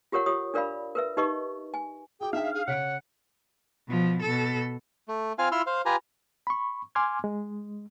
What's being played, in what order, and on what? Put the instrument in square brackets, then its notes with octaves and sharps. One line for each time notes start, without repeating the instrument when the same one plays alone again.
[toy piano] F4 G4 A#4 C#5 F#5
F4 G4 C#5 D#6
D4 A#4 D5 F5 B5
A#4 B4 E5
D#4 G4 B4 D#5 C#6
G#5
[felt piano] F#4 D6 [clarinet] G#4 [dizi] G5
[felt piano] D4 D#4 G5 [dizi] E5 [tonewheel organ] F5
[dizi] G#4
[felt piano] C#3 B6 D7 [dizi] C#5 [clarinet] F#5
[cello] B2 F3
B2 A4
[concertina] A3
C4 F4 F5 G#5 F6
E4 F4 C6 E6 F6
C5 F5
F4 G4 B4 G#5 A#5
[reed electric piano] B5 C#6
G#5 C6 D6 F6 G#6
G#3